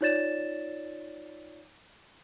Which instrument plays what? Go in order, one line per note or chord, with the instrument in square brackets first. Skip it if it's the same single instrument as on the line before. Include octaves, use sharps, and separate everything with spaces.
[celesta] D#4 F4 C#5 D5 A6 E7